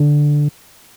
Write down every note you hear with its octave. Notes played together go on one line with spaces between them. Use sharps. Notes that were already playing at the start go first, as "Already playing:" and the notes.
Already playing: D3